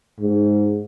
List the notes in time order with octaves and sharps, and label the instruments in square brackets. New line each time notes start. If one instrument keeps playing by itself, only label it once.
[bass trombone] G#2